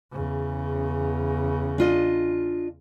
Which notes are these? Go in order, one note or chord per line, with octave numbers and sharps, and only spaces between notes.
E2 C#3
D4 F4 D#5